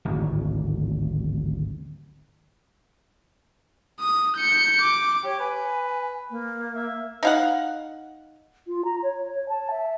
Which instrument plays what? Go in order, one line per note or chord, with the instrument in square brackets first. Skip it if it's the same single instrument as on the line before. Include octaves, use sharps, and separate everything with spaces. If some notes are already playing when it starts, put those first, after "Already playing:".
[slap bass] D1 G#1
[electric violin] D#6
G6 C#7
D6
[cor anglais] G4 [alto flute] C#5
[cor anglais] B4 [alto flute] G#5
[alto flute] A#3
[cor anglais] E5
[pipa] D#4 F5 F#5
[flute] F4
A#5
C#5
C#5
A5
E5